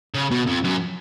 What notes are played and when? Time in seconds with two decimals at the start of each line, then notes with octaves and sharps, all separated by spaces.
0.15 C#3
0.31 B2
0.46 F2
0.64 F#2